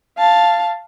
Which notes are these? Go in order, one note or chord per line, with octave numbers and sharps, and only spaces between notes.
F5 A5